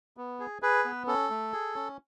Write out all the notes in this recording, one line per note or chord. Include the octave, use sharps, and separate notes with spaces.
B3
G#4
G#4 B4
B3
C#4 A4
A3
G#4
C#4